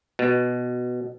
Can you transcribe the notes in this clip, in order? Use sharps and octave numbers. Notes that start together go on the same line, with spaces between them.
B2